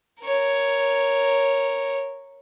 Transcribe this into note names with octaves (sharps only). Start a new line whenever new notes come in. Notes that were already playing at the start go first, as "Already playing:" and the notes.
A#4 C#5